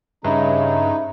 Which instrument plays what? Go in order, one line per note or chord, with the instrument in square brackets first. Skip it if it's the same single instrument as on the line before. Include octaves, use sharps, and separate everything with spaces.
[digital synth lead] G2 [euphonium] C#3 [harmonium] D#4 [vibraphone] E5 B5